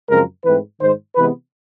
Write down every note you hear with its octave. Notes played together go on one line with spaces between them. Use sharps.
F#2 C#3 F3 G#3 C4 A#4
G#2 E3 A3 C4 B4
G#2 D#3 G#3 C5
C3 E3 G#3 B3 B4